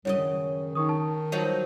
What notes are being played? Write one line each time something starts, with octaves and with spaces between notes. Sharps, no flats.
C2 F#2 C#3 C#5 D#5
D#3
D#3 D#4 C#6 D#6
A5
F3 F#3 D#4